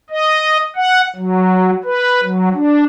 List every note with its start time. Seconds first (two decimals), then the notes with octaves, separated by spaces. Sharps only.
0.10 D#5
0.76 F#5
1.16 F#3
1.84 B4
2.23 F#3
2.54 D4